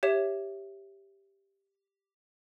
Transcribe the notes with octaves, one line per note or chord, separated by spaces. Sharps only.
G4 C#5 E5 E7